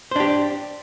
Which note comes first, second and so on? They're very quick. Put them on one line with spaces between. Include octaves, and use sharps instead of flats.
C5 D4 G4